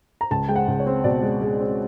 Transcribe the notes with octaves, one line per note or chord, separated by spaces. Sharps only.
A#5
C#2 A5
G#3 G5
F#5
C#2
C#5
C4
B2 D5
G#3
G#3
C4